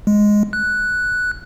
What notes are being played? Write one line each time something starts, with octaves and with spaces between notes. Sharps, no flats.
G#3
F#6